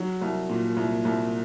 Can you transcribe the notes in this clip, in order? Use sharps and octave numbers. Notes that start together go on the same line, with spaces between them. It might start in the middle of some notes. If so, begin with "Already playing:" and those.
Already playing: F#3
C2
A#2
C2
C2